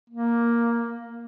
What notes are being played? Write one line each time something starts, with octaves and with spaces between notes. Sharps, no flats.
A#3